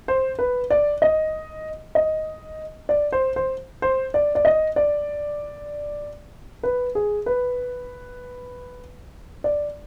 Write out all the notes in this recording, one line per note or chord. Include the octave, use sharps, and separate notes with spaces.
C5
B4
D5
D#5
D#5
D5
C5
C5
C5
D5
D5
D#5
D5
B4
G#4
B4
D5